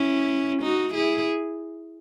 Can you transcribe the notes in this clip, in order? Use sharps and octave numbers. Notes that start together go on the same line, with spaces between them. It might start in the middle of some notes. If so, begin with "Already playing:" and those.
Already playing: C#4 E4
D#4 F#4
E4 G#4